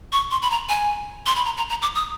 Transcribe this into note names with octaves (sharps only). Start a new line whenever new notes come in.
C#6
C6
B5
A#5
G#5
C6
B5
A#5
A#5
A#5
D6
D#6